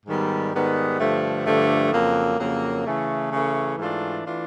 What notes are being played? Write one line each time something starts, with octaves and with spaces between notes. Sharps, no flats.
G#2 D#3 G3 B3
G#2 D#3 G3 B3
G2 D3 F3 A3
G2 D3 F3 A3
F2 C#3 F#3 A#3
F2 C#3 F#3 A#3
C#3 E3 A3
C#3 E3 A3
G#2 E3 A3 D4 F4
E3 A3 D4 F4